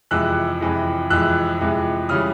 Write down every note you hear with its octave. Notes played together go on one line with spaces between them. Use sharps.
F2 C3 E3 G#3 E6 F#6
F2 C3 E3 G#3
F2 C3 E3 G#3 E6 F#6
F2 C3 E3 G#3
C#3 E3 G3 D#6 F6